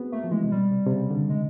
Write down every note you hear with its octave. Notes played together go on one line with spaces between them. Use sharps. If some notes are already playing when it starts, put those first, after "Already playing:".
Already playing: B3 C4 F#4 G#4
A3 A#3
F3
E3 G#3
C3
B2 G3
C3
C3
C#3
D3
G#3